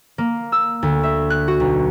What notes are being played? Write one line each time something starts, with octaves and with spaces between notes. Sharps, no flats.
A#3
E6
D2
E5
F#6
F#4
B1